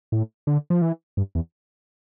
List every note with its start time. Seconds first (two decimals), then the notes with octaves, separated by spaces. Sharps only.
0.12 A2
0.47 D3
0.70 F3
0.82 E3
1.17 G2
1.35 E2